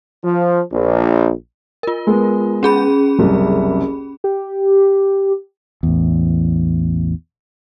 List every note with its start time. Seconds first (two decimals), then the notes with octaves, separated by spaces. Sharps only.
0.23 F3
0.73 A#1
1.83 F4 A#4
2.07 G#3 B3
2.63 C#4 G#4 B5
3.19 F#1 C2
4.24 G4
5.83 A1 E2